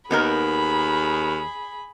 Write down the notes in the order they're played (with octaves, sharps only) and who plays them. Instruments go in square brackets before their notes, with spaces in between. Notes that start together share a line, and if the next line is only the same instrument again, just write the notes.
[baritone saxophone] D#2 [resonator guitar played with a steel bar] B3 D#4 A#4 [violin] G#4 B5